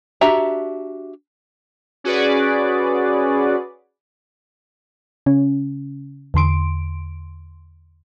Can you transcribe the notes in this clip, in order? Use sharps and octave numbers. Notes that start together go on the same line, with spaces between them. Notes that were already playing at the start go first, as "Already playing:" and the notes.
D4 F#4 G4 E5 A#5
C#4 F#4 G#4 B4 D5
C#3 C#4
E2 D3 C6 D7